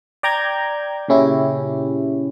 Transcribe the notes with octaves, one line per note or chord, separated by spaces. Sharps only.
D5 G5 A#5 D6 G6 G#6
A#2 C#3 C#4 E4 G4